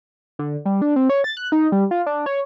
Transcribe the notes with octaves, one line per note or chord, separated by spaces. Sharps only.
D3
G3
D4
C4
C#5
A6
F#6
D#4
G3
F4
D4
C#5